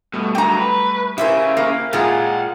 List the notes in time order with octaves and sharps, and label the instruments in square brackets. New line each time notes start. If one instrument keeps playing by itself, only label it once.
[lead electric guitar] B2 [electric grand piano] G3 A3
[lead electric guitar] D3 F#3 [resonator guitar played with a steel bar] G5 A#5
[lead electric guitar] B4
[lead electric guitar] C#3 [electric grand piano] C#4 E4 G4 [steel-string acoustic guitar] A#4 C5 E5
[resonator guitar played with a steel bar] A#3
[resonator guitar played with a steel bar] A#2 G#3 F4 [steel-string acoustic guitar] G#4 [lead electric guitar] F5 F#5